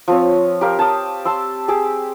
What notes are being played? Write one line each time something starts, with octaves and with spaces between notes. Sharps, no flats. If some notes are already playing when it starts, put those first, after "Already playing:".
F3 C4 C#5
G4 A#4 F5
A5 D#6
A5 C6 E6
G4 G#4 D6 E6